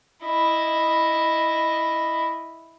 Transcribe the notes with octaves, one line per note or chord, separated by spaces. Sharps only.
E4 D#5